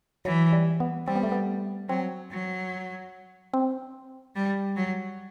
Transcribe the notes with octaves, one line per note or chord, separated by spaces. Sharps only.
E3 F#3
G3
B3
G3 C4
B3
A3
B3
F#3 C4
F#3
C4
G3
F#3